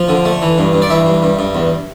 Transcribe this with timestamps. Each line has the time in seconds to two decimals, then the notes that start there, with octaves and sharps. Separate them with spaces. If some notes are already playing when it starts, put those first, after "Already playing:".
Already playing: F3
0.09 D3
0.25 A3
0.42 E3
0.58 G2
0.73 G2
0.82 D5
0.90 E3 E5
1.06 G2
1.23 G2
1.39 G2
1.55 E2